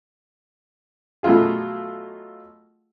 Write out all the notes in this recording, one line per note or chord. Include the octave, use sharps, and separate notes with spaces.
B2 F#3 A3 F4 G#4